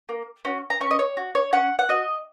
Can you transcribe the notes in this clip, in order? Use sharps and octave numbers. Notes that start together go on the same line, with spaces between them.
A#3
C#4 F#4
A#5
C#4 C#6
D#5
C#5
F#4
C#5
C#4 F#5
F#5
F#4 D#5